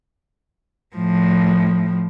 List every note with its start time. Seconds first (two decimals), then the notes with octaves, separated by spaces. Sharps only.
0.96 A2 F3